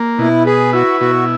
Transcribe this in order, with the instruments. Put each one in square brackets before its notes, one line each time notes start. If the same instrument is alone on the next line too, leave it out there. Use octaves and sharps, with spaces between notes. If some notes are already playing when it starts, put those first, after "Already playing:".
Already playing: [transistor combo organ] A#3
[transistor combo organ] B2 [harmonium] E4
[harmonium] G#4 [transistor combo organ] B4
[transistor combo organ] E4 [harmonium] F#4
[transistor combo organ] B2 [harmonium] F#4